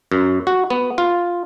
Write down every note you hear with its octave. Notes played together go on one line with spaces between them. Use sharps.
F#2
F#4
B3
F4